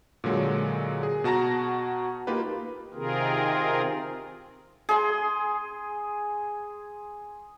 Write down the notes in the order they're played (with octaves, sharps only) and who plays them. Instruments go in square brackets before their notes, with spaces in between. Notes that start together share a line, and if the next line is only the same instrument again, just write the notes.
[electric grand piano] A#2 D3 F#3 G#3
G#4
B2 F#4 A5 A#5 A#6
A#3 D#4 F4 G4 B4
[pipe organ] C3 D#3 C4 F4 G#4 A#4
[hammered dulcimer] G#4 C6